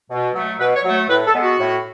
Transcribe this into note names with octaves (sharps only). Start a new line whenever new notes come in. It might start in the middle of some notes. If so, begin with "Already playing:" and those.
B2
F#3 A3
B2 B4
C#5
F#3 A3
C#5
A2 B4
A4
G#3 B3
F#4
A2